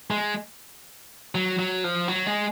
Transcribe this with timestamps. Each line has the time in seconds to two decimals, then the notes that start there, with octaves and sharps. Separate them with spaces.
0.11 G#3
1.35 F#3
1.59 F#3
1.84 F3
2.08 F#3
2.26 G#3